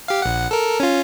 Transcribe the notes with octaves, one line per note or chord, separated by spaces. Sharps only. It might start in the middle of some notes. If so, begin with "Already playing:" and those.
G4 F5
A#1 F#5
A4 A#4
C#4 F4